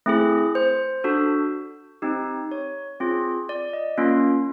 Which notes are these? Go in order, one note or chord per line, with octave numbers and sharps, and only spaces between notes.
A3 C4 E4 G#4
C5
D4 F#4 A4
C4 D#4 G4
C#5
C4 F4 G#4
D5
D#5
A#3 C#4 F4